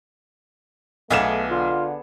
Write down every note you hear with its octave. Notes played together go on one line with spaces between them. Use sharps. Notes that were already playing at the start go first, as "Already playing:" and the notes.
B1 A3 B3 G#4 D5 F5 E7
D3 F4